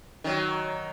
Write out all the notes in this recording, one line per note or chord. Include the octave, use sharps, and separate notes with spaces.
D#3 F#3